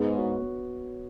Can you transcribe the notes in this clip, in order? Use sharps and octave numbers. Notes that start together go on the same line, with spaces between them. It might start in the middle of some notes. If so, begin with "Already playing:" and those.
Already playing: G#2 B3
F#4 C#5
B3